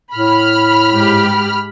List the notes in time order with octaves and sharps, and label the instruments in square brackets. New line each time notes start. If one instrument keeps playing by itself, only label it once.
[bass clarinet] A2 [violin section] B5 F6
[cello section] G#2 G4